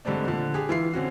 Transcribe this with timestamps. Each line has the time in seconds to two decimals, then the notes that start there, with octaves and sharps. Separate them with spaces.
0.05 G#2 D3 G3 A3 C4 D4
0.27 A#2 D3 F3
0.54 G4 G#4
0.69 E3 F4 E5 C7
0.93 D3 C4 C#4 F#4